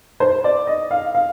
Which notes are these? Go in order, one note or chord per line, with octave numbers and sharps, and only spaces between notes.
C5
D5
D#5
F5
F5